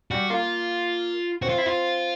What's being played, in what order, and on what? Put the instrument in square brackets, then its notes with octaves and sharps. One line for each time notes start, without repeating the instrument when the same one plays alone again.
[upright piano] G3 [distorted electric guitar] F#4
[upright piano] A#3 [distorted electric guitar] F4
[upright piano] C4 [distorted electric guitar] F#4
[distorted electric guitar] F4
E4
F4